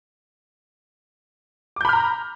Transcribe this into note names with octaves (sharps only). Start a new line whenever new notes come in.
A#5 B5 D6 F6 G6